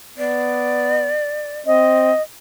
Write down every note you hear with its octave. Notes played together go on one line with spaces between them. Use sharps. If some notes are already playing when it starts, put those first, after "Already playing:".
B3 D5
C4 D#5